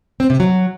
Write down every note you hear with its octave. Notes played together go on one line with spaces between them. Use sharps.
C4
C3
F#3